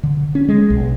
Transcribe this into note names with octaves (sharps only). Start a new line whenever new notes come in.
D3
C#4
G#3
B1